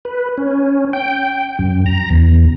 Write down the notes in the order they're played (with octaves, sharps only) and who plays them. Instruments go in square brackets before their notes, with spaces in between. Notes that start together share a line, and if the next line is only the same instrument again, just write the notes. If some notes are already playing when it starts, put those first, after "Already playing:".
[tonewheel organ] B4
C#4
G5
F#2
A#5
E2